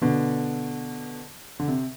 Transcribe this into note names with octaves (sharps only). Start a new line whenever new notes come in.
B2 D3
D3
C3